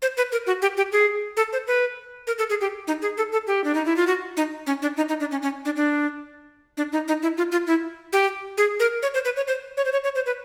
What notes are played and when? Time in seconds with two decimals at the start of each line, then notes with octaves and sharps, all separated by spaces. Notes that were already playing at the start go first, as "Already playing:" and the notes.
0.02 C5
0.17 B4
0.32 A#4
0.46 F#4
0.62 G4
0.77 G4
0.92 G#4
1.37 A4
1.53 C5
1.67 B4
2.27 A#4
2.38 A4
2.50 G#4
2.61 G4
2.87 D#4
3.02 G#4
3.17 A4
3.32 A4
3.47 G4
3.64 D4
3.75 D#4
3.85 E4
3.96 F4
4.07 F#4
4.37 D#4
4.67 C#4
4.82 D4
4.97 D#4
5.09 D#4
5.20 D4
5.31 C#4
5.42 C#4
5.65 D4
5.76 D4
6.77 D4
6.92 D#4
7.08 D#4
7.22 E4
7.37 F4
7.52 F4
7.67 E4
8.13 G4
8.57 G#4
8.80 A#4
9.02 C#5
9.14 C5
9.25 B4
9.36 C#5
9.47 C5
9.77 C#5
9.85 C5
9.92 C#5
10.04 C#5
10.15 C5
10.26 B4